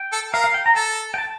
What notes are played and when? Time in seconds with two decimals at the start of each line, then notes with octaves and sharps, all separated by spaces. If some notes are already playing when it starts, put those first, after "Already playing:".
Already playing: G5
0.12 A4
0.33 A#4 F5
0.44 F5
0.54 G5
0.66 A#5
0.76 A4 A5
1.14 G5
1.18 A5